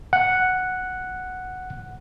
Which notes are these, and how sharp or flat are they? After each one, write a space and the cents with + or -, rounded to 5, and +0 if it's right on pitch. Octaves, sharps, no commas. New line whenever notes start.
F#5 +0